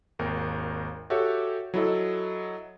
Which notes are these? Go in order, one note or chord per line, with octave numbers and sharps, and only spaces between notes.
G#1 D#2 A#4
F#4 G4 A4 C#5 E5
F#3 E4 A4 D#5